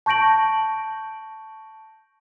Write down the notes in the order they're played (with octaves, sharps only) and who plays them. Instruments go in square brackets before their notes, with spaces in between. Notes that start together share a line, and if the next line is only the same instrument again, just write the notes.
[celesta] A5 C#6 G6 A#6 D7 F#7